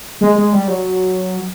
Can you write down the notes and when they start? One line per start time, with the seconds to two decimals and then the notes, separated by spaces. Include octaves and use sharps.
0.21 G#3
0.36 G#3
0.53 G3
0.68 F#3